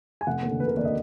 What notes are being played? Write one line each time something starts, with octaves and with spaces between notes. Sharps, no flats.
G#5
F1 F#5
D#2
D3
F1 B4
A#4
D#2 D5
D3 D#5